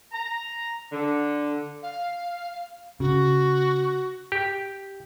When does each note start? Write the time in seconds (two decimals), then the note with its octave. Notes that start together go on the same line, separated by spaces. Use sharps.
0.12 A#5
0.92 D3
1.83 F5
3.00 C#3 F#4
4.32 G4